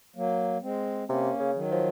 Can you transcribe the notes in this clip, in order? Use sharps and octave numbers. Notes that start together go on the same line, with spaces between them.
F#3 A#3
G#3 C4
C3 A#3 C#4
C#3
D#3 F#3
F3